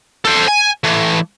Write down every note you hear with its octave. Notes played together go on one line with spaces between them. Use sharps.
A4 C5
G#5
E3 A3